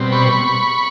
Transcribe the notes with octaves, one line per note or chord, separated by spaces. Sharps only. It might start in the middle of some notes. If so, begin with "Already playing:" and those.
Already playing: B2 G3 C4
B5 C#6